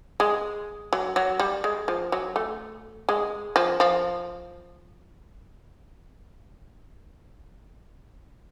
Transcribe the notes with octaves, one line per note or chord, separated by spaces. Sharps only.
G#3
F#3
F#3
G3
G#3
F3
F#3
A3
G#3
F3
F3